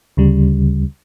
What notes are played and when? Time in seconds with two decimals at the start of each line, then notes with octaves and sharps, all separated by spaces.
0.17 D2 C#3 G3